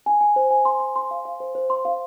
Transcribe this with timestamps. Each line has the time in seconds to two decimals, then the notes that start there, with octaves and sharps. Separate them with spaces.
0.06 G#5
0.21 G#5
0.36 C5
0.51 G#5
0.65 C6
0.80 C6
0.96 C6
1.11 F5
1.25 F5
1.40 C5
1.55 C5
1.70 C6
1.85 F5